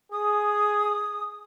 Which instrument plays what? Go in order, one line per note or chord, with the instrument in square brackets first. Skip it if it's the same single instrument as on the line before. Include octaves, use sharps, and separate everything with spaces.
[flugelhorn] G#4 [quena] D#6